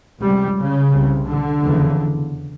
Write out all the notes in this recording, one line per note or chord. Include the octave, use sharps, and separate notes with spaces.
C#2 C3 G3
C#3
C2 C3
D3
F1 E2 C#3